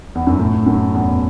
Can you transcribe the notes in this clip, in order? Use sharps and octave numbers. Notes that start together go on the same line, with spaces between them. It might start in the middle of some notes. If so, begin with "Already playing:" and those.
E2
F#2
A2
F#2
E2